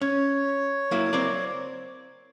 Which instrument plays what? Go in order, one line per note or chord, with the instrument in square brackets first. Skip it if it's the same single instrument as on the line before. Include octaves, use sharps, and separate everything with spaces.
[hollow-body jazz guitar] C#4 [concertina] C#5
[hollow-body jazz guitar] F#3 A#3 E4
C4 A#4 D5